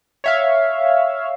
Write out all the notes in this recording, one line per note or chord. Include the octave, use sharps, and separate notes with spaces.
C#5 E5 F5